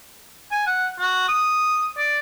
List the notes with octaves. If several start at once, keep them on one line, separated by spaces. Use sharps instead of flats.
G#5
F#5
F#4
D#6
D5